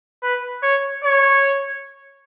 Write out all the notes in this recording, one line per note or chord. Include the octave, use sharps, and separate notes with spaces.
B4
C#5
C#5